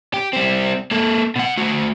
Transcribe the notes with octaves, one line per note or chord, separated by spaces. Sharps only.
G4
G3 C4
A#3 A4
B2 F#5
A3 F#4